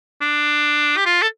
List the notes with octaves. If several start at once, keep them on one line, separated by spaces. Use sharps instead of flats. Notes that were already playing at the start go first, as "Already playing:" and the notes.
D4
G4
F4
A4